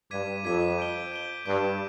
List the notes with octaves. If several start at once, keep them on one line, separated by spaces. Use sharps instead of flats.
G2 D6 G#6 B6 D#7
F2 D6 G#6 B6 D#7
G6 D7 G7
G6 D7 G7
G2 D6 G6 D7 G7